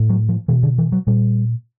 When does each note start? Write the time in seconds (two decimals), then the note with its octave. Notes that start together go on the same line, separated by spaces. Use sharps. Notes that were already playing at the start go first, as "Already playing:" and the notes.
Already playing: A2
0.10 F#3
0.29 F3
0.48 B2 E3
0.63 D3
0.78 E3
0.92 F#3
1.07 A#2 G3